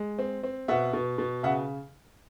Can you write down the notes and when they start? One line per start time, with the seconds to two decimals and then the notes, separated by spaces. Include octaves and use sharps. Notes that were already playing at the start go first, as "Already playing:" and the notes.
Already playing: G#3
0.19 C4
0.43 C4
0.68 B2 E5 F#5
0.93 B2
1.18 B2
1.43 C#3 E5 F#5